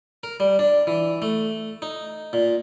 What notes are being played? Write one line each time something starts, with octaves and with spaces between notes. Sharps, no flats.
A#4
G3
D4
E3
A3
D#4
A#2